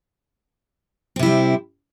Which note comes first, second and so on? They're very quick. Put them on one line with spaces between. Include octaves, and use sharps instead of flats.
C4 C3 E4 G3